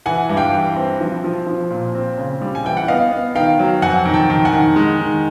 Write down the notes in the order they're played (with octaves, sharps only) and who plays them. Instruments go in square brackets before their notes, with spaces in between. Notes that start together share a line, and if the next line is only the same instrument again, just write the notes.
[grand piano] E3 [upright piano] F#5 G#5
[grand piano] G2
[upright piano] F5 G5
[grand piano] E3
C4
F3
F3
F3
A#2
C4
C#3
G3
[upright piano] G#5
[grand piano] E3 [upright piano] G5
[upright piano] F#5
[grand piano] B3 [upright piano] D#5 F5
[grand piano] B3
[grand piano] D#3 [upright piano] F5 G5
[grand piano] F#3
[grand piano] F2 [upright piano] F#5 G#5
[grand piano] D#3
[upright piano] G5 A5
[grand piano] D#3
[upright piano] F#5 G#5
[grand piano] D#3
G#3
D#3